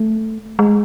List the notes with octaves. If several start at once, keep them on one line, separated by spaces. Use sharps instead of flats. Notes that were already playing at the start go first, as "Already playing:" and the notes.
Already playing: A3
G#3